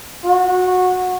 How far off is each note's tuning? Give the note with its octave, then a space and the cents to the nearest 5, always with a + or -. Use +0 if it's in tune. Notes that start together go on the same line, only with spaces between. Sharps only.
F#4 -20